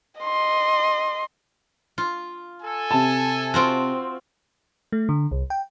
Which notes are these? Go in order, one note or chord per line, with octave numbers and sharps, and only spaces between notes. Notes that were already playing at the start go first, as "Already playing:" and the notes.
D#5 C6
F4
A4 G#5
C3 A5
C4 F4 F#4
A3
D3
C2
G5